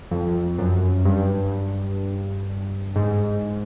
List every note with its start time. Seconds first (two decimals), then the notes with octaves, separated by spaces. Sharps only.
0.11 F2
0.58 F#2
1.05 G2
2.96 G#2